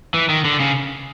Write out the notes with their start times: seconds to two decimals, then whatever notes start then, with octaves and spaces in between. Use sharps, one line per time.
0.14 E3
0.29 D#3
0.45 D3
0.60 C#3